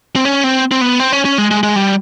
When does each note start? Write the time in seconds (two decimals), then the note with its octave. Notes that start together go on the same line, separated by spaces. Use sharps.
0.16 C4
0.25 C#4
0.44 C4
0.71 C4
0.81 B3
1.00 C4
1.12 C#4
1.25 C#4
1.38 G#3
1.51 G#3
1.63 G#3
1.76 G3